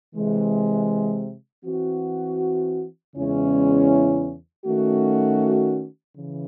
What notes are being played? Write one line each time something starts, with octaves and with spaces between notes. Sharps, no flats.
C3 E3 G#3
E3 C4 F#4
E2 C#3 G#3 C#4 E4
D#3 A3 C#4 F#4
C#3 E3